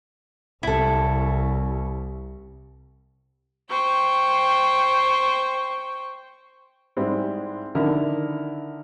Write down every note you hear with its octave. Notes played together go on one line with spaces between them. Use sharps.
C2 E4 A4
C5 G5 C#6
G#2 G3 G#3 C4 E4
D3 D#3 E4 A#4